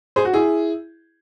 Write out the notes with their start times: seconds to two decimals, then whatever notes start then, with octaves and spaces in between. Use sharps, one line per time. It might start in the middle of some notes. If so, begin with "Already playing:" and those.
0.16 G#4 C5
0.25 F#4
0.33 E4 G#4